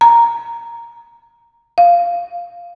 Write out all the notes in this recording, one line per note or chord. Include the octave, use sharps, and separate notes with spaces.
A#5
F5